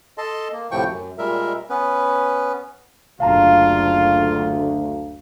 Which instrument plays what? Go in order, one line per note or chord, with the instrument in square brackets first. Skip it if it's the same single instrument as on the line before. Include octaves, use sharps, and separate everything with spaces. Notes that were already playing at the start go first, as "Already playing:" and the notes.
[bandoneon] A4 D#5 A5 C6
A#3
D2 A2 C3 F3 G5 C#6
F#2
A#2 G3 G#3 A#4 E5
B3 C#4 B4
[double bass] F#1 [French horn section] D2 [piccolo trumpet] F4 [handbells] F5 A5 A#5